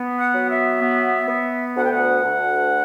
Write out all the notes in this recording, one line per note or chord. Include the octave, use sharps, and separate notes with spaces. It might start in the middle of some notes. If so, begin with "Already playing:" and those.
Already playing: B3
F#5
F#3
E5
B3
B3
D2 F#5
G5
F#5
D2